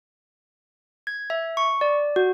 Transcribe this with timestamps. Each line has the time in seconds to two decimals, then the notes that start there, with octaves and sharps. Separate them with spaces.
1.07 G#6
1.30 E5
1.57 C#6
1.81 D5
2.16 F#4